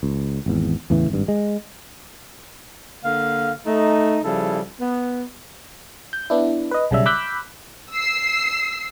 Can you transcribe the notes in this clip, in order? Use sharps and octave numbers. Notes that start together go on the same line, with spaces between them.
C#2
G#1 E2
E2 A2 C#3 E3
G#1 G2
G#3
D3 A#3 F5
A3 D#4
C#3 F3 G3 E4 A4
B3
G6
B3 D4 E4
B4 D#5
B1 C#3 G3 E5
B5 D6 E6 F#6 G6 B6
E6 C7